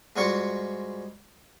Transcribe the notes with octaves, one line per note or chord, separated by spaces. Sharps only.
G#2 G3 G#3 F4 F#4 C#6